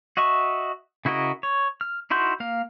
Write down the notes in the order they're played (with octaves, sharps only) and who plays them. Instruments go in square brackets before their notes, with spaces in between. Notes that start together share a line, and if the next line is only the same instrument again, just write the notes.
[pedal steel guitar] F#4 D#5 E5 C#6
C#3 E4 F#4 A#4 D#5
C#5
F6
D#4 E4 F#4 C6 G6
A#3 F5